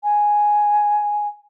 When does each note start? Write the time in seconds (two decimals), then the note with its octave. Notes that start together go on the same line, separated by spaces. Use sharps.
0.04 G#5